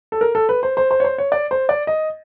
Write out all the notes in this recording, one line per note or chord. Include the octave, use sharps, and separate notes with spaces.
A4
A#4
A4
B4
C5
C5
C5
C#5
C5
C#5
D5
C5
D5
D#5